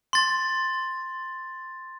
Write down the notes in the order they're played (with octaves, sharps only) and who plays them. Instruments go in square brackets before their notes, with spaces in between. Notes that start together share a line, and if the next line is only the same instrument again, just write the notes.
[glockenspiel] C6 A6